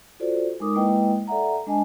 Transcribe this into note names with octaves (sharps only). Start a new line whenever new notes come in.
F4 F#4 A4 C5 D5
G#3 D#4 A#4 D6 D#6
G#3 A#3 E4 B4 D#5 G5
A4 D5 E5 F#5 A#5
G#3 D4 D#5 G#5 A5